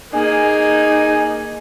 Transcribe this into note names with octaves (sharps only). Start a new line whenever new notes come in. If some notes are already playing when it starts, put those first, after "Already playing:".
A#3 D#4 G#4 G#5